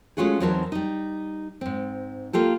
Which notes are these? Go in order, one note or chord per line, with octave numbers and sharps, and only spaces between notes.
G#3 A3 C#4 F4 F#4 G#4
E2 F#3 C4 D#4 A#4 A5
G3 D#4
G#2 C4
A#3 F4 G4 A4